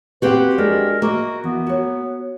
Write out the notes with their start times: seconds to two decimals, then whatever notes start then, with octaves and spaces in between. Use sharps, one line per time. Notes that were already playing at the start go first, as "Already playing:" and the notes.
0.22 A#3 C4 F#4 G4 B4 C5 F#5
0.58 G#3 D4 G#4 A#4
1.02 A#3 F#4 D#5 E5
1.44 E3 B3
1.67 F#4 C#5